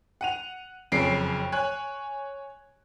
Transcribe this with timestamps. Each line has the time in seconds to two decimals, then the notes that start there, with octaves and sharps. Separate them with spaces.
0.21 F#5 D#7 F7
0.92 F#1 F2 C#4 C7 D7
1.52 C#5 G#5 F#6